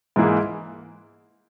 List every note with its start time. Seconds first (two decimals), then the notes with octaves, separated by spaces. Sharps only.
0.16 G#2 E3 A#3 E4 G#4